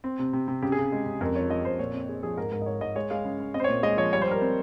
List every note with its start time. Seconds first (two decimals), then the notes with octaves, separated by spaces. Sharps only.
0.04 C4
0.19 C3
0.33 C3
0.48 C3
0.62 C#3 G4
0.72 G#4
0.78 C#3
0.92 G#3
1.06 C#3
1.21 F2 A#4
1.35 F3 C#5
1.50 F3 D#5
1.65 F2 C5
1.79 A#2 C#5
1.94 C4
2.09 C4 G#4
2.23 F3 G#4
2.37 G#2 A#4
2.52 G#2 A#4
2.62 D#5
2.66 G#2 C#5
2.81 G#2 D#5
2.96 G#3 C#5
3.10 G#3 F5
3.25 C#3
3.39 C#3
3.54 C4 D#5
3.60 C5
3.64 C#5
3.68 A#2
3.83 G#3 D#5
3.97 F3 C#5
4.13 G3 C#5
4.22 C5
4.27 G3 A#4
4.41 C4